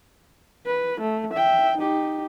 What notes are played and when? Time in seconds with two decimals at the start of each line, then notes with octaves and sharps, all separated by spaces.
0.66 B4
1.01 A3
1.34 E5 G5
1.78 D#4 G4